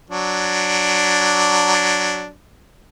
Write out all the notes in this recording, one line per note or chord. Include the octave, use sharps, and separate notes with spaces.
F#3 D4